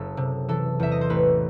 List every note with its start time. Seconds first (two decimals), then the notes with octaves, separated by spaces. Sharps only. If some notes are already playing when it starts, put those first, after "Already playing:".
Already playing: F#1 A4
0.17 C3
0.48 E3 A4
0.80 E2 E5
0.92 D#5
1.01 C5
1.10 A1 B4